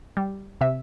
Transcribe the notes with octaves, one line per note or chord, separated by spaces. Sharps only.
G3
C3 E5